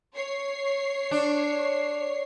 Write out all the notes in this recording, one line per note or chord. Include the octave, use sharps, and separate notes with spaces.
C#5 C7
D4